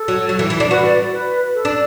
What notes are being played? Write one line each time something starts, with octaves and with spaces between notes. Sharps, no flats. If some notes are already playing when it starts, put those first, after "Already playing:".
Already playing: A4
F#3
F#3
E3
E3
D4
F#4 B4
D5
B4
A4
D4